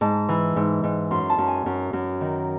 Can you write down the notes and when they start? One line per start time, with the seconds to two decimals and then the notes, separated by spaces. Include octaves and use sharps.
0.01 G#2 A5
0.29 E3
0.56 G#2
0.84 G#2
1.11 F#2 C6
1.30 A5
1.38 F#2
1.48 G#5
1.66 F#2
1.93 F#2
2.21 D#3